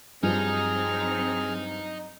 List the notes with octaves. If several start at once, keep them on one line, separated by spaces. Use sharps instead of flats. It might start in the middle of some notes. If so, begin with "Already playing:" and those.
G2 F3 F#3 C4 D#4 G#4 D#5 F6